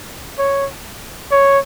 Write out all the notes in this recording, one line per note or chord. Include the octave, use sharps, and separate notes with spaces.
C#5
C#5